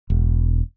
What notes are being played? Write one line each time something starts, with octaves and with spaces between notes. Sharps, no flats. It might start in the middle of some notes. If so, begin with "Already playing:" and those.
E1